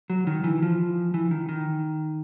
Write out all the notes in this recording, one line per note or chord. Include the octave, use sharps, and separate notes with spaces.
F#3
D#3
E3
F3
E3
D#3
D#3